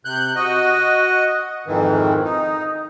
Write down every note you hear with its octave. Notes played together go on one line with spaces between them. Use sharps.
C3 F#6 G6
F#4 D#5
F2 G#2 D#3 E3
D#4